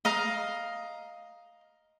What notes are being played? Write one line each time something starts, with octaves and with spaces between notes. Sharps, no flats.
D#5 F5 A#5